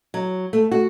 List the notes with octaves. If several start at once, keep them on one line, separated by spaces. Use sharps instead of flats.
F#3
A3
F#4